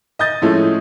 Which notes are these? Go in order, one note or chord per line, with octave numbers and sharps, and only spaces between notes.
D#5 D#6 G6 A6
A2 F3 G#3 A3 C#4